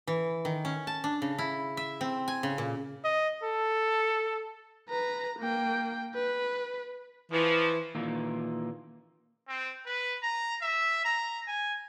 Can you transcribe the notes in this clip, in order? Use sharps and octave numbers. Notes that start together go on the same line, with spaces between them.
E3
D#3
C#4
A5
D4
C#3
E4
E5
C4
G#5
C#3
A#2
D#5
A4
B4 A#5
A#3 G5
B4
E3 F3
A#2 D#3 E3 A#3
C4
B4
A#5
E5
A#5
G#5